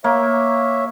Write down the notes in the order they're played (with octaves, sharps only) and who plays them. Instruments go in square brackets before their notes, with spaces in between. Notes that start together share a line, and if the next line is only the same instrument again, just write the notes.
[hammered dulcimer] A#3 [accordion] C#5 E5